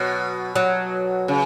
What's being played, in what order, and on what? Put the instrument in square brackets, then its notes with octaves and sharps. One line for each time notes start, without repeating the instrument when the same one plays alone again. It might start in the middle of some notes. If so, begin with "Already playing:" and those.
Already playing: [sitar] B2 [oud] F#3
[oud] F#3
[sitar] C#3